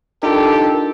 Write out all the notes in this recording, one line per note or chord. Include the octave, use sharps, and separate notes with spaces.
D4 D#4 F4 G4 A4 A#4